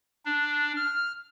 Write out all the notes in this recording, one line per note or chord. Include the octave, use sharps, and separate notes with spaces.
D4
F6